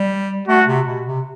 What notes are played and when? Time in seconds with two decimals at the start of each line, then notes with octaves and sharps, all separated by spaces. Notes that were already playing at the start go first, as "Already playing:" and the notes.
Already playing: G3
0.48 A3 F#4
0.67 C3
0.87 B2
1.06 C3